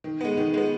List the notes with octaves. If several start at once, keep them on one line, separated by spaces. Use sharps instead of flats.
D#3
G#3 B3
D#3
G#3 B3